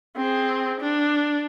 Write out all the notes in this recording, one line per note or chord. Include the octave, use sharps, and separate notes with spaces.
C4 G#4
D4